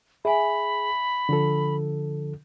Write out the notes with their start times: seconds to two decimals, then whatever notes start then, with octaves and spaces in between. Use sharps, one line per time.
0.25 G#4 E5 G#5 B5
1.29 D3 F3 A4